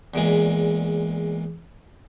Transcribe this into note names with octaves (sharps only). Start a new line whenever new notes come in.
E2 A#2 G#3